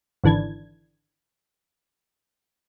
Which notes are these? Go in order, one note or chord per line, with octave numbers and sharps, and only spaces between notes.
G#1 D3 E3 D4 G#6